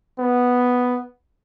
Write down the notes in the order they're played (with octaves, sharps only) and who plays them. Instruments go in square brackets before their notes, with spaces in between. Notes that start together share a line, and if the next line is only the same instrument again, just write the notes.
[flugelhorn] B3